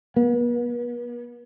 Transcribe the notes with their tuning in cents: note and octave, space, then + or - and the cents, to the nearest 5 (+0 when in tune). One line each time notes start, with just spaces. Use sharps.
B3 -45